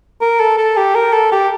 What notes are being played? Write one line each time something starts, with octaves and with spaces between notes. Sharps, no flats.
A#4
A4
A4
G4
A#4
A4
G4